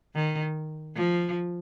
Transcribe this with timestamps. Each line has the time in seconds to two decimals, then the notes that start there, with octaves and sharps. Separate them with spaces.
0.15 D#3
0.96 F3